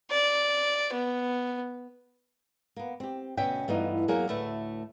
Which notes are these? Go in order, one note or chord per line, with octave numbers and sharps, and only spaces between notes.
D5
B3
A#3 B3
C4 G4
D2 B2 C#4 E5 G5
G2 E3 A3 B3 D#4 F4
E2 F#3 A#3 G#4 A#4 G#5
D2 A2 A3 B4 E5